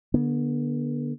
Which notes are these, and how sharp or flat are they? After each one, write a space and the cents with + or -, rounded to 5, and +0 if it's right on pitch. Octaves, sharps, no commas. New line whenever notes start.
D3 +0 B3 -40